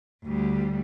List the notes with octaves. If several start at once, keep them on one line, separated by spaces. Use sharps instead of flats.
D2 G3